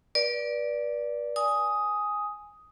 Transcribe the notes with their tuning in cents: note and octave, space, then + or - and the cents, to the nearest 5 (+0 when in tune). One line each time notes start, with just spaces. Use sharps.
B4 -40 D5 +0
G#5 +0 D#6 +10